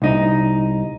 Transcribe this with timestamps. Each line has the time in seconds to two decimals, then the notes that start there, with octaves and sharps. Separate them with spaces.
0.02 C2 D#4